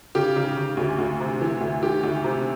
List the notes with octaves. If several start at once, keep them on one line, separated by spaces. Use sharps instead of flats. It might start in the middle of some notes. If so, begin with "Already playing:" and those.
C#3 G4
C#3
C#3
D2
D2
C3
E3
D2
D#3 G4
D2
C3